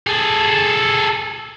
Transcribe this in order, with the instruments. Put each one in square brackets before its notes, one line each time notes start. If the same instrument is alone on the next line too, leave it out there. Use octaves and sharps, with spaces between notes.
[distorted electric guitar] G#4 A4